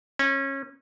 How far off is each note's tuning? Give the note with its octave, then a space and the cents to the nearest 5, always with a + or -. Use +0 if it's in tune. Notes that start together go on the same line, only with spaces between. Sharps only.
C#4 -25